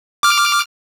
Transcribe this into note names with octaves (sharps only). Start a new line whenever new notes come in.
D6 F6